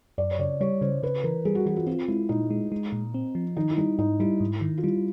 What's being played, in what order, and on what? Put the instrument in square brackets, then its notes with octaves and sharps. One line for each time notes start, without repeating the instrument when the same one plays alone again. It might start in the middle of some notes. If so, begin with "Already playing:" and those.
[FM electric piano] F#2 [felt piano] D5
[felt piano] C#5
[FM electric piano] C#3 [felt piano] D5
[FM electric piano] G3 [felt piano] C#5
[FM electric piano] C#3 [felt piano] C5
[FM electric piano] C#3 [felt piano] B4
[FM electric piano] E3 [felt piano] A#4
[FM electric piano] G3 [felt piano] G#4
[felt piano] F#4
[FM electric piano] E3 [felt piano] F#4
[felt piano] F4
[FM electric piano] C4 [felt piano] F4
[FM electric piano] G#3 [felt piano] E4
[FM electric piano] A#2 [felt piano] D#4
[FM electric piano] G#3
G#3
A#2
C4
F3
[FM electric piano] D#3 [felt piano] D#4
[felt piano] E4
[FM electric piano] G3 [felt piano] D#4
[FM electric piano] G#2 [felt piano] D#4
[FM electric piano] G3 [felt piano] E4
[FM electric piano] G#2
D#3
[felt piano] F4
[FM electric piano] G3 [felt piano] E4